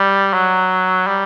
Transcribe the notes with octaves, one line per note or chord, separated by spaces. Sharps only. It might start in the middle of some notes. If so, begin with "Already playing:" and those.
Already playing: G3
F#3
G3